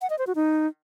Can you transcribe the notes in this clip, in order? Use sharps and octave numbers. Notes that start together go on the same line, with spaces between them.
F#5
D#5
C5
F#4
D#4